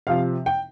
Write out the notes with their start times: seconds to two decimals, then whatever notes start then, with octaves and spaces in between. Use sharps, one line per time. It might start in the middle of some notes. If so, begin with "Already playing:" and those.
0.07 C3 F3 F5
0.46 G5